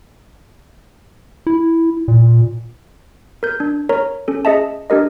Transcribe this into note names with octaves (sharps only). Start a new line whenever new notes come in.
E4
A#2
A#4 G6
D4
A#4 C#5 A#5
C#4 A4
G#4 D#5 E5 A5
D4 G4 A#4 D#5